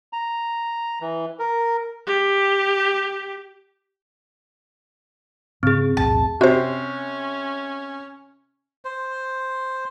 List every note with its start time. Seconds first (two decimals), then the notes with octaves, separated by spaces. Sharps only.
0.13 A#5
1.01 E3
1.39 A#4
2.07 G4
5.63 G#2 C#3 C4 C#4 G#4
5.97 B1 E2 A2 A5
6.41 C3 C#4 F#4 C5
8.85 C5